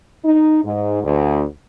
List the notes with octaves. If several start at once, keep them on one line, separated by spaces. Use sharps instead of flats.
D#4
G#2
D2